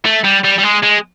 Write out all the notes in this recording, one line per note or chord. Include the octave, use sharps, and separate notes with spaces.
A3
G3
G3
G3
G#3
G#3